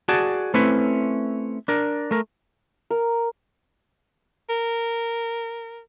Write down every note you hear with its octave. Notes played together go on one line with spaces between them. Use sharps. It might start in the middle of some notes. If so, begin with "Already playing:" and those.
F#4 G#4 D5 A5
A3 C4 C#4 E4 B4
D4 A#4
A3 A#4
A#4
A#4